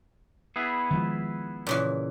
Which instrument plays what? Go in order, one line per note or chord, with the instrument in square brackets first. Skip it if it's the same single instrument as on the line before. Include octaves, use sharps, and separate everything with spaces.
[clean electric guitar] B3 E4 G#4
[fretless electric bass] D#3 F3 G#3
[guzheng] A#2 C#3 E3